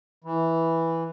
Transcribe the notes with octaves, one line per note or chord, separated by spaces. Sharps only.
E3